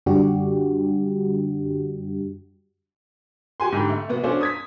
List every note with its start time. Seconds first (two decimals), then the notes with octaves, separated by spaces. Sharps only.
0.06 F#2 D3 G3 D4 F#4 G4
3.60 F#4 G4 G#5 C6
3.72 G#2 D3 G4 B5
3.90 A3
4.09 C3 A#3 B3 F#4
4.24 C#4 D4 F#4 A4 C5 D5
4.41 D#6 G#6 B6